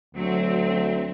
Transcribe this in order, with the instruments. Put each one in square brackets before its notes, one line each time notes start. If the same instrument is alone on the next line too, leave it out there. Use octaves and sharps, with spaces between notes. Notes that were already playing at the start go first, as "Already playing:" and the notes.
[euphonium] D2 [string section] F#3 C4